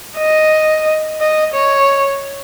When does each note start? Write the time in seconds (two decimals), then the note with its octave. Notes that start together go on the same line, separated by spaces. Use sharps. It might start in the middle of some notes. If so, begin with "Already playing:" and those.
0.18 D#5
1.20 D#5
1.53 C#5